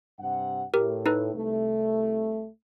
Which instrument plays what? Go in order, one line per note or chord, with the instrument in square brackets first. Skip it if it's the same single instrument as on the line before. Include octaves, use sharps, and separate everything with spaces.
[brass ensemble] G2 C3 F#5
[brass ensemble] A2 [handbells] G4 A#4
[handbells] D#4 A4 B4
[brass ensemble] C2 A3